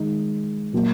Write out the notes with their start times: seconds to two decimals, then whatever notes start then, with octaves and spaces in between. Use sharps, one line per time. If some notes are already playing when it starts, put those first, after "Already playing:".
Already playing: D#3 G#3 D#4
0.73 A#2 F#3 A#3 F#4